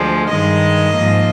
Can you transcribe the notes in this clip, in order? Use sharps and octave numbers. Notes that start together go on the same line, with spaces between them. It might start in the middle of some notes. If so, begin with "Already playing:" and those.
Already playing: D2 D3 F3 G#3
G2 D#3 G#3 D#5
G#2 F3 A#3